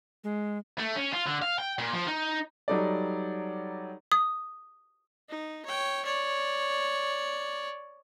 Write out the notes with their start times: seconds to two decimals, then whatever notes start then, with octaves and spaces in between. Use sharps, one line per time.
0.24 G#3
0.79 A3
0.96 C#4
1.13 F4
1.27 D3
1.42 F5
1.59 G5
1.79 A#2
1.93 F3
2.07 D#4
2.68 F#3 G3 D#4 A4 D5
4.12 D#6
5.29 D#4
5.65 C#5 G5
6.05 C#5 D5